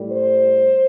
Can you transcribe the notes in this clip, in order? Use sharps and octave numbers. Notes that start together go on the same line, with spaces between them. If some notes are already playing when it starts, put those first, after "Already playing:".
Already playing: A2 G3
C5